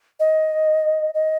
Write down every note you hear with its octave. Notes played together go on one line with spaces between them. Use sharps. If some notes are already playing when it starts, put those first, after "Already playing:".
D#5
D#5